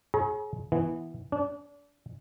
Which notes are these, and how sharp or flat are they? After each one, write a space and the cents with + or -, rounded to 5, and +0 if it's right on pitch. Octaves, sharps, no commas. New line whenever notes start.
G#4 +35 C#5 -30 A#5 +35
E3 +0 B3 +0
D4 -30 D5 -40